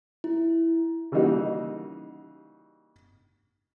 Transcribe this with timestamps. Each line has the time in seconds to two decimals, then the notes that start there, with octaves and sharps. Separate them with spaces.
0.24 E4
1.12 C#3 E3 G3 A#3 D#4 F#4